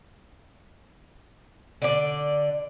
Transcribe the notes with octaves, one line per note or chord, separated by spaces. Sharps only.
D3 D5